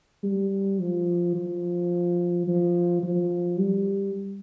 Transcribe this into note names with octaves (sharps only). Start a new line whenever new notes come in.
G3
F3
F3
F3
F3
G3